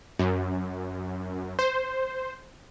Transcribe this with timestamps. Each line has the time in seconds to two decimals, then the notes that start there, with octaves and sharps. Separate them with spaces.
0.19 F#2
1.59 C5